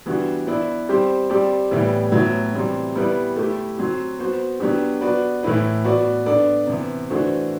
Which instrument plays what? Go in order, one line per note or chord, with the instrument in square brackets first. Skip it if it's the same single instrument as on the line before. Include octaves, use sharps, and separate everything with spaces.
[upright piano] E3 G3 B3 D4 F#4
B3 E4 B4 D5
G3 C4 G4 C5
G3 C4 G4 D5
A2 E3 G3 B3
A2 F#3 B3
C3 E3 G3 C4
G3 B3 E4 B4 D5
A3 E4 G4
F#3 C4 F#4
B3 F#4 C5
F#3 B3 D4 G4
B3 F#4 B4 D5
A2 E3 A3 E4 B4
B3 F#4 B4 D5
B3 D4 A4 D5
C3 E3 B3
E3 A3 D4 F#4 C5